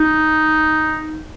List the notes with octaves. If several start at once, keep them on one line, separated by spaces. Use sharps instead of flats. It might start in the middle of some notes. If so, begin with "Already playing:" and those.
Already playing: D#4